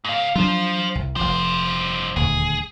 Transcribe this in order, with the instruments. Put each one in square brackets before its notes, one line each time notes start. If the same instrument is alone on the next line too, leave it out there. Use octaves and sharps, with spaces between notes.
[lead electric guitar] G#2 F5
[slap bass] F#3 D4 [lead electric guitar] F4 C5
[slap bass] C2
[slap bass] F1 F3 [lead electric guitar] G2 C5
[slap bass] D#1 D2 [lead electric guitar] G#4